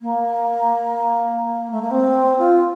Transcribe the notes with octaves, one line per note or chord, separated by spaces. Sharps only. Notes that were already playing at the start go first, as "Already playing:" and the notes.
A#3
A3
A#3
C4
F4